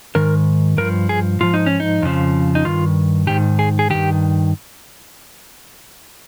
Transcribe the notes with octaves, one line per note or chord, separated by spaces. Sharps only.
G#2 D#3 A#4
G2 F3 A#4
G#4
G#2 F3 F4
D#4
C#4
D#4
F2 C#3 F3
D#4
G2 D#3 F4
G#2 D#3 G4
G#4
G#4
G2 D#3 G4